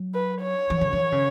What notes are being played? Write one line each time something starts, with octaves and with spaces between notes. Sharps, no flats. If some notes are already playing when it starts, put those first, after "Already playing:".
Already playing: F#3
B4
C#5
E3
C#3
E3
C#3